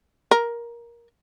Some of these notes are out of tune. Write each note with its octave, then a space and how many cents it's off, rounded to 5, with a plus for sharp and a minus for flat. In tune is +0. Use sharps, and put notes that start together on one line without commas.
A#4 +15